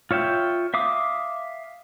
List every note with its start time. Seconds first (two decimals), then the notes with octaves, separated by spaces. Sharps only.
0.11 F4 C#5 E5 G5
0.74 E5 F5 D6 D#6